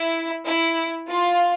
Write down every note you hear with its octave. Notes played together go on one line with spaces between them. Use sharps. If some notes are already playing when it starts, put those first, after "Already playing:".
Already playing: E4
E4
F4